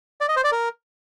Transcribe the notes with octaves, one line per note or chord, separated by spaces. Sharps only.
D5
D#5
C5
D5
A#4